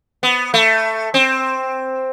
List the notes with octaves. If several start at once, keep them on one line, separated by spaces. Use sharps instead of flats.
B3
A3
C4